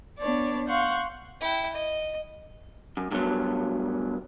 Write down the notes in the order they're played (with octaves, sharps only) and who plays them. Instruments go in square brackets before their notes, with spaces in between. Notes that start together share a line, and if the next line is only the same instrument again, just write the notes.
[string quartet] B3 D4 C#5 D5
F5 F#5 C6 C#6 G6
[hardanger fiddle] E4 G5
D#5
[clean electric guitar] F#2
G2 B2 F#3